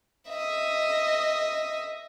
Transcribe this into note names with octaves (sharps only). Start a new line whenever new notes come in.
D#5 E5